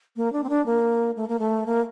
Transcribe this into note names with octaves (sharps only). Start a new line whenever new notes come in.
A#3
D4
C4
D4
A#3
A3
A#3
A3
A#3